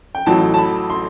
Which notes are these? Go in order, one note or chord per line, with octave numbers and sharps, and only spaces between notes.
G5
A1 A2 F#3 A5
A5
B5
C6